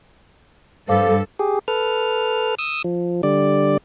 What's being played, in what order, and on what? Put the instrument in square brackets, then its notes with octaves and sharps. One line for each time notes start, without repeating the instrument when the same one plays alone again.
[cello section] G2 G3 A4 [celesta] C5 F5 D6
[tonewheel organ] G4 G#4
A4 B4 F6
D#6 E6
F3
D3 G3 D5